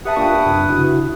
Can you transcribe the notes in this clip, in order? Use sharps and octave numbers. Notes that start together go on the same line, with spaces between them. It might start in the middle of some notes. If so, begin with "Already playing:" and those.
G4 B4 E5 F#5 A5 D#6
A#3 D4 F4 G5 A5 C#6
F#2 C3 D4
C#3 E4 F#4